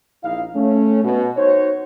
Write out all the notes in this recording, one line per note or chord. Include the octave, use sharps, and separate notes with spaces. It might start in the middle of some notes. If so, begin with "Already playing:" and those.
A#1 D#4 E4 F5
A3 C#4
B2
D#4 F#4 C5 C#5